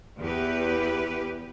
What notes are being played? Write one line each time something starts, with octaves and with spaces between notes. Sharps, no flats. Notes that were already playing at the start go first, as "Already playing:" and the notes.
E2 G4 B4